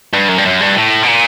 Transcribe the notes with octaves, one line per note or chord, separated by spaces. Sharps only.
G2
F#2
G2
F#2
G2
A2
B2
A#2